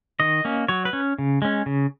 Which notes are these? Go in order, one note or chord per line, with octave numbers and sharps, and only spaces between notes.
D#3 D#5
A#3 C#4
F#3 C#5
B4
C#4
C#3
G#3 C#4
C#3